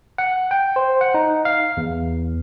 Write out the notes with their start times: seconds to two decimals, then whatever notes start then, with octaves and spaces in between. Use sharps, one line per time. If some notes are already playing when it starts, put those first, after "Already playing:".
0.18 F#5
0.51 G5
0.76 C5
1.01 F#5
1.14 D#4
1.45 F5
1.77 E2